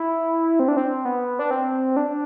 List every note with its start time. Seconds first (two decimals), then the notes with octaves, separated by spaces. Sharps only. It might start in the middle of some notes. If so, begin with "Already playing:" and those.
Already playing: E4
0.60 C4
0.68 D4
0.77 C4
1.05 B3
1.39 D4
1.51 C4
1.97 D4